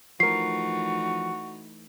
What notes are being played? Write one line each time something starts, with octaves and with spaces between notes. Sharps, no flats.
E3 F3 A3 D#4 F#4 A#4 C7